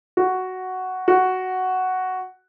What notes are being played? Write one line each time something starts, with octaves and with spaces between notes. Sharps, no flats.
F#4
F#4